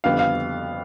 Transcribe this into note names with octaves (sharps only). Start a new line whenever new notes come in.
F2 D3 G3 B3 F5
F5